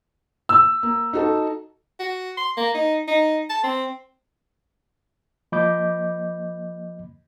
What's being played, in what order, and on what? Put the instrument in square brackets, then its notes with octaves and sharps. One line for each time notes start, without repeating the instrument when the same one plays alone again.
[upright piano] E6
[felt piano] A#3
D#4 F#4 A4
[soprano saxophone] F#4
C6
A#3
D#4
D#4
A5
C4
[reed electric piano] F3 A#3 D#5 B5 D6 G6